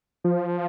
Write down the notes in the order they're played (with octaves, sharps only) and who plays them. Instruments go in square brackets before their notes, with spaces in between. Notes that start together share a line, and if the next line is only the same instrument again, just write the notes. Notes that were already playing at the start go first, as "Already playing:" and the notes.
[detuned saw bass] F3